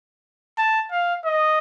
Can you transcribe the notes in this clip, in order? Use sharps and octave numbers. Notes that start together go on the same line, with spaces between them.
A5
F5
D#5